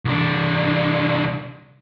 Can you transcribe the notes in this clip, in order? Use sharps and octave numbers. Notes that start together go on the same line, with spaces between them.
C2 D4